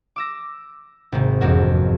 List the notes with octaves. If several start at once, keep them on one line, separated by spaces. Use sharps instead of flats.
D6 E6 A#6
G#1 C3
E1 F2 A#3 F#4